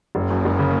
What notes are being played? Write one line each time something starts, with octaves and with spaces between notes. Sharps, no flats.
F#1 A#3
F#2
F#1 A#3
C#3